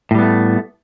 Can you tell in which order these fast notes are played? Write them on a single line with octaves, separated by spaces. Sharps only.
A2 G3 B3 A3